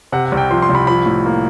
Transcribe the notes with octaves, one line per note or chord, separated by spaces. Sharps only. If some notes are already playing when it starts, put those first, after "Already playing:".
C3 F#5
F#5
C2
G5
F3 C6
C6
C2
B5
F3 B5
A2
A#3